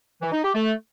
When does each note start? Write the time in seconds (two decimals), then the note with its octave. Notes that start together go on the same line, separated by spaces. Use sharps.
0.21 E3
0.32 D#4
0.43 G4
0.54 A3